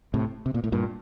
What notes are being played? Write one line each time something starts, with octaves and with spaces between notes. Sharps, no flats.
A2 C3
C3
A#2
A2
G2 A#2